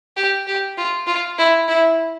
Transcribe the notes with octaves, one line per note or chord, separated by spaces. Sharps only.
G4
G4
F4
F4
E4
E4